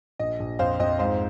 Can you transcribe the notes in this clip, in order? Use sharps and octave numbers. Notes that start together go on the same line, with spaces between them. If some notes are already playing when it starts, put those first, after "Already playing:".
A#1 D#5
A#1
F2 C5 F5
F2 D#5
G#2 C5 F5